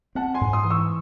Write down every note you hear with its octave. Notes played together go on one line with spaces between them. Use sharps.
C4 F#5 A5
G#5 C6
G#2
C6 D#6
E3
C#6 E6